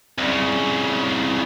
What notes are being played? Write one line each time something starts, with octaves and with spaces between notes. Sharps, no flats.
C2 C#3